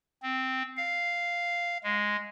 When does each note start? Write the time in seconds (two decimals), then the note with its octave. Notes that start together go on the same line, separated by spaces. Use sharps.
0.22 C4
0.77 F5
1.84 G#3